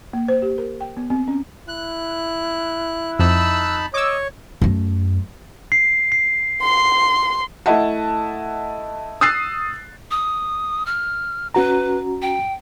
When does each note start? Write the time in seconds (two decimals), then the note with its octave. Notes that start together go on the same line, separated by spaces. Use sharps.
0.13 A#3
0.28 C5
0.42 G4
0.58 A#4
0.81 G5
0.97 B3
1.10 C4
1.28 C#4
1.68 E4 F#6
3.19 F2 D#4 A5 B5 E6 F#6
3.94 C#5 D#5 D6 E6
4.62 F#2 A3
5.72 C7
6.12 C7
6.62 C6
7.66 A3 E4 D#5 E5 F#5 A5
9.21 D#6 E6 F#6 A6 C7
10.11 D#6
10.86 F6
11.54 C#4 F#4 B4 A#5
12.22 G5